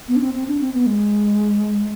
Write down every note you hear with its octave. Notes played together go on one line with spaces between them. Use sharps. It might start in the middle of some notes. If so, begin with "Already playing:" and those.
B3
D4
C4
C4
D4
C4
B3
G#3